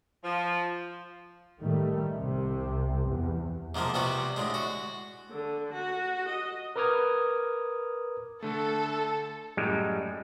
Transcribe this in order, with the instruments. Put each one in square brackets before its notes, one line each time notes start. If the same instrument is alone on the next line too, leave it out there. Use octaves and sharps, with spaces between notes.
[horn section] F3
[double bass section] A2 D#3 G3 A3
C2 C3
E2
[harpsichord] G#2 C3 F3 A#3
C3 G3 B3 F#4
A2 D3 G#3
F#4
[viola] D3
F#4
D#5
[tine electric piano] A#4 B4 D6 D#6 F6 G#6
[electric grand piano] D3 A3 [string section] A4
[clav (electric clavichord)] F#2 A2 G3 G#3